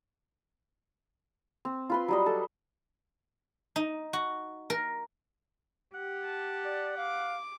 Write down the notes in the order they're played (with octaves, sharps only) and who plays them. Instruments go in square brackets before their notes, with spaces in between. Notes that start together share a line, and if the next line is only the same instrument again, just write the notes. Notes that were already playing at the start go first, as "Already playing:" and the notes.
[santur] C4
F4 B4 C6
F#3 G3 D#5
A4
[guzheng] D#4
F#4
A#4
[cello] G4 [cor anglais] F#5
[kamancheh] A5
[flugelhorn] D5
[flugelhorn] F5 [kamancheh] D6